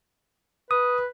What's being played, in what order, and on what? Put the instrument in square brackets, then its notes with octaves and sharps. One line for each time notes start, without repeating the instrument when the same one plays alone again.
[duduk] B4 [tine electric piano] D#6